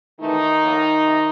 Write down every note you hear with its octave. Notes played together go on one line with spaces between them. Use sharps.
C3 D#3 E3 A3 D#4
A2 F3 A#3
C3